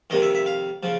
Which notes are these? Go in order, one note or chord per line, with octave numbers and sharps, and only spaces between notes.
F2 C3 D#3 D#5
E5
E5
F5
C#3 F3